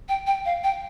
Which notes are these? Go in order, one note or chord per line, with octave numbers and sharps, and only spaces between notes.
G5
G5
F5
G5